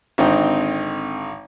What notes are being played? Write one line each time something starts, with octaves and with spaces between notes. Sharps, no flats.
G#1 D3 C4 D#4 G5